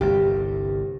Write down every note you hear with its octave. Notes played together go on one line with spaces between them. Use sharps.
G1 C2 G2 G4